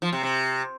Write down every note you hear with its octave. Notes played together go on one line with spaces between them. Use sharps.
F3
C3
C3